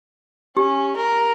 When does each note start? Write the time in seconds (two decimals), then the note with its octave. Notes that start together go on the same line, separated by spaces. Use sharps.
0.57 C#4 G4
0.96 A#4